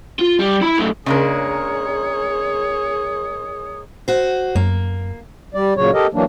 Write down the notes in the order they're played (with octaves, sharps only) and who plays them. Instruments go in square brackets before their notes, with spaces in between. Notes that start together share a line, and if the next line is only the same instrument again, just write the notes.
[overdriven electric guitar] F4
G3
E4 B5
F#2 A3
[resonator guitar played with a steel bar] C#3 A#3 D4 [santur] G#3 A#4 [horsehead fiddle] G#4 C#5 [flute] D#6
[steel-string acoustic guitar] F#4 C5
[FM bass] F#2 [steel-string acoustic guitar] A#3
[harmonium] G3 D5
A#2 C#3 F#3 C#5
G4 A4 A#4 D#5
E3 F#3 A#3 D4